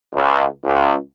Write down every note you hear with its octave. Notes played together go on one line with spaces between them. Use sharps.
C#2
C#2